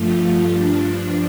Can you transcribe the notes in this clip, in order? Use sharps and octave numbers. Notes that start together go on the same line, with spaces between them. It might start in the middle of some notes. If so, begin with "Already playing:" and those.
Already playing: G2 F3 A3 F4
G2 F3 D4